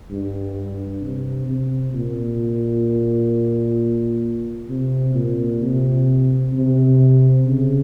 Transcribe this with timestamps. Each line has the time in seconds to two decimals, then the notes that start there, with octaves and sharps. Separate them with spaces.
0.10 G2
1.01 C3
1.47 C3
1.93 A#2
4.69 C3
5.15 A#2
5.61 C3
6.53 C3
7.45 C#3